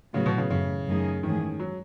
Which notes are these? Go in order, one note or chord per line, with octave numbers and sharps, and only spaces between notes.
A2 C#3 F#3 B3 F#4
B2
C#3
F#2 C#3 E3 A3
F#2 D#3 A3 D#4 G#4
G#2 D#3 E3 A3 C#4 G#4
F#3